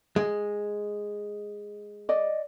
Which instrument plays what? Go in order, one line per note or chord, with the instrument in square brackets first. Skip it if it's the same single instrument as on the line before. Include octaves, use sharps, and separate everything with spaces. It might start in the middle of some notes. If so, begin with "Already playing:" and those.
[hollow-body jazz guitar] G#3
[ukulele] D5 D#5